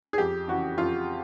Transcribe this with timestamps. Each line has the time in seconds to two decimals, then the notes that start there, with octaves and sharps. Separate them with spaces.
0.13 G#4
0.18 F2 G4
0.48 C#3 E3 F#4
0.78 F2 F4